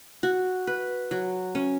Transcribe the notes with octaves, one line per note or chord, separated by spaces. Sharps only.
F#4
B4
F#3
C#4